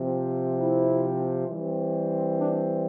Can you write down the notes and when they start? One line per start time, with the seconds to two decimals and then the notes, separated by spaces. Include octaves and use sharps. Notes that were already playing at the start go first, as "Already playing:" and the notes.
Already playing: C3 F3 C4
0.58 E4
1.48 E3 G3 C4
2.38 D4